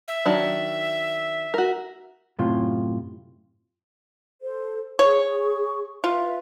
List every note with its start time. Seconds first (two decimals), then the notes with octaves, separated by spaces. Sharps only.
0.08 E5
0.26 D#3 F#3 D4
1.54 F#4 A#4
2.39 F#2 A2 C3 F4
4.42 A4 C5
4.99 G#4 C#5 C#6
6.04 F4 B4 E5